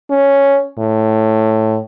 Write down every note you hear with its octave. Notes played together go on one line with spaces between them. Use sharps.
C#4
A2